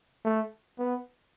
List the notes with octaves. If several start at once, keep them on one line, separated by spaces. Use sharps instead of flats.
A3
B3